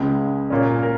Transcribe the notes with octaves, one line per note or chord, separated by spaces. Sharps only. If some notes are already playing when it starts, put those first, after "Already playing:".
Already playing: C#2 C#3 G#3
A#2 A#3 C#4
A#4